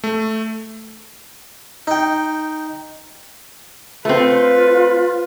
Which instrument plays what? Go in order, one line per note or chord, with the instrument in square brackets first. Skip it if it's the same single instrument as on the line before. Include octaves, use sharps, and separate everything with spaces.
[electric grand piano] A3
[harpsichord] D#4 G5
[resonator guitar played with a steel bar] A3 C4 [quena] F4 [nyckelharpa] B4